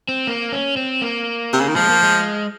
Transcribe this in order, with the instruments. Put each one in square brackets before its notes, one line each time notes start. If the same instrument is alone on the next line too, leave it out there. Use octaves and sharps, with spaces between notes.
[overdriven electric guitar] C4
A#3
C#4
C4
A#3
[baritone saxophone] C3
C#3
D#3
[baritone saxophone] F3 [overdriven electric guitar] G#3
[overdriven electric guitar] A#3
G#3